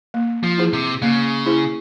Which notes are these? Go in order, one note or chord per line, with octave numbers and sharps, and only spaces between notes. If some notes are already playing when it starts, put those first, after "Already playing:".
A#3
F3
E4 G#4 C5
C3
C#3 A#3
E4 G#4 C5